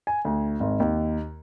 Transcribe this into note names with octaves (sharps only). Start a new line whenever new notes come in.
G#5
D2
G#1
D#2